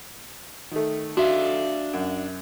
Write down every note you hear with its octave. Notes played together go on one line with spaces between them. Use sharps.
D#3 A3
D4 F#4 E5 F5
F#2